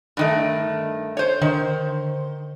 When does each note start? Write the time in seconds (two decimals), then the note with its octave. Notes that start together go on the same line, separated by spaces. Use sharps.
0.17 G2 D#3 A3
1.17 C5 C#5
1.42 D3 D#3 C5 C6